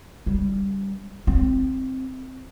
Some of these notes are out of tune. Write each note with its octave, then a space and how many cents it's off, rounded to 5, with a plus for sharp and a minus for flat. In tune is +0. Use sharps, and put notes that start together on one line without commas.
G3 +0 D4 -45
C4 +0 D#4 +0